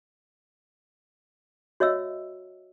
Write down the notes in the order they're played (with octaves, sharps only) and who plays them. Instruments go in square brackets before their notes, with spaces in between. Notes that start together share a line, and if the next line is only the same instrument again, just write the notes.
[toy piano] F#4 C#5 D#5 E5 E6